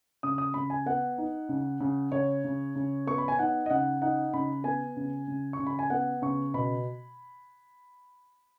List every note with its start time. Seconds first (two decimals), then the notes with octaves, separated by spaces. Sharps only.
0.23 C#3 D#6
0.38 D#6
0.54 C#3 B5
0.70 G#5
0.86 B3 F#5
1.18 D#4
1.49 C#3
1.80 C#3
2.12 C#3 C#5
2.44 C#3
2.75 C#3
3.07 B3 C#6
3.18 B5
3.28 G#5
3.39 D#4 F#5
3.66 D#5
3.70 C#3 F#5
4.02 D#4 F#5
4.34 C#3 B5
4.64 B3 G#5
4.97 C#3
5.28 C#3
5.53 C#6
5.59 C#3
5.67 B5
5.79 G#5
5.90 B3 F#5
6.22 C#3 C#6
6.54 B2 B5